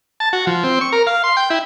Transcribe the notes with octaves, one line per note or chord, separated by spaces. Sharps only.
A5
F#4
F3
C4
C#6
A#4
F5
C6
G5
E4